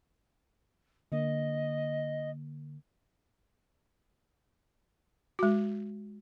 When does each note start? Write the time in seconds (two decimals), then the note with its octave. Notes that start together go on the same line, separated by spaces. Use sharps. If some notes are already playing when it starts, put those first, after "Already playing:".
1.12 D3 A#3 D#5
5.39 G#3 F#4